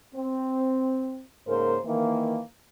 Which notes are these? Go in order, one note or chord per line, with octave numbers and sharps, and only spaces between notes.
C4
G#2 C#3 A#3 A#4 C5
D#3 E3 A#3